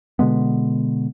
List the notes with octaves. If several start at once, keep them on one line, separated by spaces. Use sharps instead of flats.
B2 D3 G#3 B3